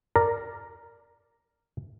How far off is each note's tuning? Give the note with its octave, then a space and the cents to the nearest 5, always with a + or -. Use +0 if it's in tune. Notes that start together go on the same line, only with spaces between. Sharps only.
A#4 -10 D5 +0 A#5 +0